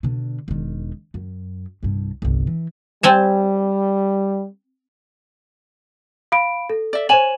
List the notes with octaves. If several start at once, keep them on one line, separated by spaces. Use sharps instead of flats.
B2 D3
E1 D#3
F#2
C2 G2
G1 C2
E3
G3 C4 G#5 A5
F5 B5 D7
A4
D5 E5
C5 C#5 G#5 E7 F#7